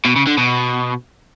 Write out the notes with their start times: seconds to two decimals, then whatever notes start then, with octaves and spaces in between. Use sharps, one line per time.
0.06 B2
0.16 C#3
0.27 D3
0.38 B2